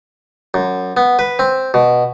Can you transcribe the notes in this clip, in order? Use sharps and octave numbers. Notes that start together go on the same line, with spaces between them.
F#2
B3
B4
C4
B2